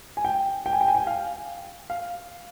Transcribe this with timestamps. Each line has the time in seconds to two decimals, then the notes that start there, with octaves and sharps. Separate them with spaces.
0.17 G#5
0.25 G5
0.66 G5
0.73 G#5
0.81 G5
0.88 G#5
0.95 G5
1.07 F5
1.90 F5